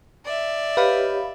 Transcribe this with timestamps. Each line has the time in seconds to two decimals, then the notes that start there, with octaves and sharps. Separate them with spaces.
0.24 D5 E5
0.77 G4 B4 C#5 D#5 F5 B5